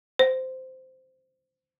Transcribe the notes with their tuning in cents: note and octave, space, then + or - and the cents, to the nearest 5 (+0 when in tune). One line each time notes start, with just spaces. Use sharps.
C5 -10